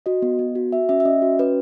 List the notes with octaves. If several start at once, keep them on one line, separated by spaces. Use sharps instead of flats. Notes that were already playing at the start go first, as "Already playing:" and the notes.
F#4 D#5
B3
B3
F#4
F#4 E5
C#4 E5
E5
C#4 D#5
F#4
C#4 B4